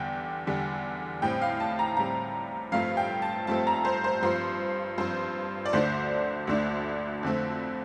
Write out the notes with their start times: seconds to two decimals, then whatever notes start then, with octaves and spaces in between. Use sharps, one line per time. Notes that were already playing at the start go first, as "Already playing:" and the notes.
Already playing: E2 D3 G3 G5
0.47 E2 D3 G3
1.22 A2 G3 C4 G5
1.42 F5
1.60 A5
1.79 A#5
1.97 A2 G3 C4 A#5
2.72 G2 F3 A3 C4 F5
2.97 G5
3.22 A5
3.47 G2 F3 A3 C4 A5
3.67 A#5
3.85 C5
4.04 C5
4.22 G2 F3 C4 C5
4.98 G2 F3 C4 C5
5.66 D5
5.73 D2 D3 A3 D4 C5
6.47 D2 D3 A3 D4
7.23 F2 D3 A3 C4